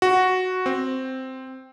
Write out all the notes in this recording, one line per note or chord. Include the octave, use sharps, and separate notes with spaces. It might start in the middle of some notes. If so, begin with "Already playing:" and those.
F#4
C4